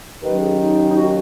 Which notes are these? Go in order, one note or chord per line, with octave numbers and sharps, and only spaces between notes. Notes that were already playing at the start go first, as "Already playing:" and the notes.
D#2 D#3 F#3 C#4 B4
G#4
D#4
D#4
F#4